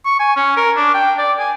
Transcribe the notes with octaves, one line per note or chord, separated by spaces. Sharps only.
C#6
G#5
C#4
A#4
D4
G5
D5
G#5